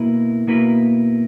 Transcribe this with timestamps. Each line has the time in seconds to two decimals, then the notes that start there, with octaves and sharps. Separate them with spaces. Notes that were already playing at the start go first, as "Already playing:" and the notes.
Already playing: B2 A#3 E4 B4
0.47 B2 A#3 E4 B4